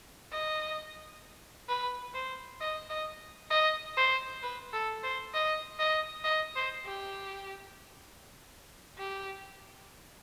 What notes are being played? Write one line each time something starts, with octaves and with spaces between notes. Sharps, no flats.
D#5
B4
C5
D#5
D#5
D#5
C5
B4
A4
C5
D#5
D#5
D#5
C5
G4
G4